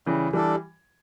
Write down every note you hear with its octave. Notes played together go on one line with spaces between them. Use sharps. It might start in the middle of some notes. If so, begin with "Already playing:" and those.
C#3 E3 G3
E3 G3 D4 A4 D5